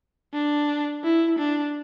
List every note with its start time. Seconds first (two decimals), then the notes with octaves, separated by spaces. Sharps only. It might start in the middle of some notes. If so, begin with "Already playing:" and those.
0.34 D4
1.04 E4
1.39 D4